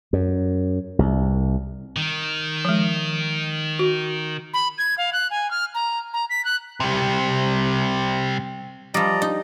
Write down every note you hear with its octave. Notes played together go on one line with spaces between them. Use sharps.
F#2
C2
D#3
F3 G#3
F#4
B5
G#6
F5
F#6
G#5
F6
A#5
A#5
B6
F#6
C3 G3
F3 G3 D5 D#5 A#5
D#4